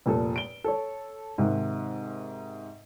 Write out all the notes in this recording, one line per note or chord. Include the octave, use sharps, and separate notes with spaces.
F1 A#2 A4
D7 G7
A4 C#5
G#2 C3 D#3